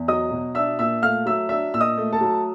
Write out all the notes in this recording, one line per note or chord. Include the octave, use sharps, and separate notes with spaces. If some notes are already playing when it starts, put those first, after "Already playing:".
Already playing: E2
F#3 D#5 D#6
B2
D4 E5 E6
A#2 E5 E6
A3 F5 F6
F#3 E5 E6
D4 E5 E6
A#2 E6
D#5 D#6
A3
A4 A5
F#3